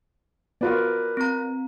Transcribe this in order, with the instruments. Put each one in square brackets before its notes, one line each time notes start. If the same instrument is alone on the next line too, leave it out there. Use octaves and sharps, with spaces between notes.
[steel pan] B3 F4 F#4 [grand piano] A#4 B4 D5
[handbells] C4 A#5